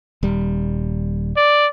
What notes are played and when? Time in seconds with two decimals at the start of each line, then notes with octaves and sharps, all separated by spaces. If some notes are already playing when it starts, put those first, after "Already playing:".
0.23 D#1 G3
1.37 D5